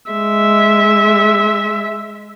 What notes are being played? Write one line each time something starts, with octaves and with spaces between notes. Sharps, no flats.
G#3 E5